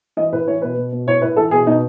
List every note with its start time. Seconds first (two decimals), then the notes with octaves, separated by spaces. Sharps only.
0.17 E3 D#5
0.32 A2 B4
0.47 E3 C#5
0.62 B2 B4
0.77 B2
0.92 B2
1.07 A2 C#5
1.22 A2 B4
1.36 E3 A4
1.51 B2 G#4
1.67 B2 D#4